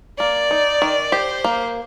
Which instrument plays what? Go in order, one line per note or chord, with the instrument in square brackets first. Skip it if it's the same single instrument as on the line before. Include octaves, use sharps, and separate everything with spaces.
[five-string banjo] A#3 [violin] D5
[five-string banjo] D#4
D#3
[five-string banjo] G4 [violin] C5
[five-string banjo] A#3